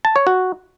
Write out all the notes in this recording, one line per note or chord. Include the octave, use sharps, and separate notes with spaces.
A5
C#5
F#4